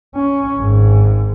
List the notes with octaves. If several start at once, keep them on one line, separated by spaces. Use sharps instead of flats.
C#4
G#1 G#2